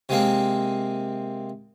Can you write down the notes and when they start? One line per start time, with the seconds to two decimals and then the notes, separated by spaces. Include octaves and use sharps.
0.09 C3 G#3 A#3 C4